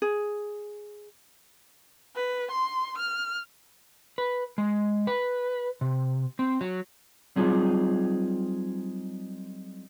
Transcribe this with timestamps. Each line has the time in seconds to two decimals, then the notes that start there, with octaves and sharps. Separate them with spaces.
0.02 G#4
2.16 B4
2.52 C6
2.98 F6
4.18 B4
4.58 G#3
5.07 B4
5.81 C3
6.39 C4
6.61 F#3
7.36 F#3 G3 C4 D#4 F4 G#4